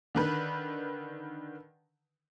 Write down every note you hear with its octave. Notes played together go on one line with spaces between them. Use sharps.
D3 D#3 B4